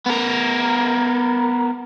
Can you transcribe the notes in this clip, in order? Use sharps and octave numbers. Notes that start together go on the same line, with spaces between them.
B3 A#4